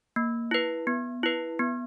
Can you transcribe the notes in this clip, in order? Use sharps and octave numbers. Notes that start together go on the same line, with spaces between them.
A#3
E4 B4
B3
E4 B4
B3